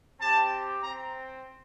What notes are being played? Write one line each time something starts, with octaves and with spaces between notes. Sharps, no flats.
C4 G4 A5
C4 A#5